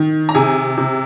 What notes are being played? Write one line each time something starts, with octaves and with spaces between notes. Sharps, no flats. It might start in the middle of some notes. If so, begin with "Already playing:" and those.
Already playing: D#3
A#5
C3 G#4 G#5
C3